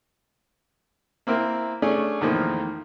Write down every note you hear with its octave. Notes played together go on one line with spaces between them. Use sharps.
A#3 C4 E4 A#4
A3 C#4 D4 G#4 C#5 D5
E2 A2 D#3 F3 A#3